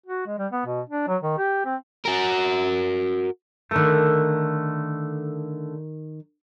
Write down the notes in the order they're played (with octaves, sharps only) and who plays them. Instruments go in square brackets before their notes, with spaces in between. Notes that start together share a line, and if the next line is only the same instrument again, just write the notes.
[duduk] F#4
G#3
G3
B3
B2
D4
F#3
D#3
G4
C4
[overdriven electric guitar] F#4 A#4
[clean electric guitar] D3 A3 [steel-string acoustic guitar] D#3 A#4